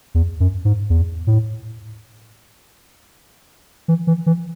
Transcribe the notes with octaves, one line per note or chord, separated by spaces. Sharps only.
E2
F#2
G#2
E2
A2
E3
E3
E3